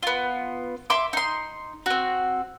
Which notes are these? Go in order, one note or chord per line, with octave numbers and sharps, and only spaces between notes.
B3 F4
E5 C6 D6
D#4 C6
C4 F#4